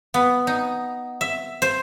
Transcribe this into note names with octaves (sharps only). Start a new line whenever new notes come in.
B3
D#4
E5
C5